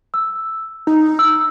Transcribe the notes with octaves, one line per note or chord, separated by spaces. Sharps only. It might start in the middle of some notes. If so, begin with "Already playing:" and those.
E6
D#4
E6